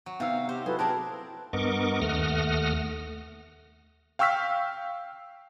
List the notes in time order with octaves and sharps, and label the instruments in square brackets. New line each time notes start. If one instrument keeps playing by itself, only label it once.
[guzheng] F#3
[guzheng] C3 F#3 [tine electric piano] B3 D#4 E6 [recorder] F5
[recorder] G4 [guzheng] C5
[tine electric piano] F#3 E4 F#4 [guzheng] G#4 [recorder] A4 [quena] B4
[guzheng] C4 A#4 D5 [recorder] G#4 [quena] A5 [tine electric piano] F#6
[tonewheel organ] G2 B3 A#4 D#5 C#6 D6
D#2 A3 F#5 D#6 F6 A#6
[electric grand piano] F5 G5 C#6 E6 F6 B6